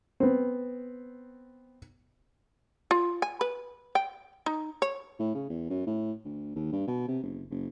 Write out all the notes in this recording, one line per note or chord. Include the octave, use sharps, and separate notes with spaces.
B3 C4
F4
G#5
B4
G5
D#4
C#5
A2
C#3
E2
F#2
A2
D2
D#2
G2
B2
C3
F#1
F#1